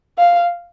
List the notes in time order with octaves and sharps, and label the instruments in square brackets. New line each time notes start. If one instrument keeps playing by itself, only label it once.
[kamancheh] F5